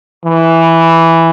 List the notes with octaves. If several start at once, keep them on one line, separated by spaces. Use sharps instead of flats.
E3